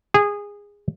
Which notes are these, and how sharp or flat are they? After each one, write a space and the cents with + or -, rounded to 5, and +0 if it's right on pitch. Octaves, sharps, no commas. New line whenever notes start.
G#4 -20